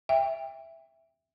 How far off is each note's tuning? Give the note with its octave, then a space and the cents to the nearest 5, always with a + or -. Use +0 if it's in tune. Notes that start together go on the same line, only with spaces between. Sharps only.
E5 +0 G5 +25